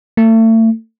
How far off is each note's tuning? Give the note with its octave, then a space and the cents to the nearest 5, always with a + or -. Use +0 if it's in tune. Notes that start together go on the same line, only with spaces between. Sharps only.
A3 +35